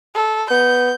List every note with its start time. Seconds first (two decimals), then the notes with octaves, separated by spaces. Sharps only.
0.14 A4
0.50 B3 G6